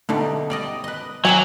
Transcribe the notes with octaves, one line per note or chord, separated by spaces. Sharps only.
B2 D3 G3 A3 D#4
G3 D5 D#5
B4 D#5
F#3 D5 E5 G5 G#5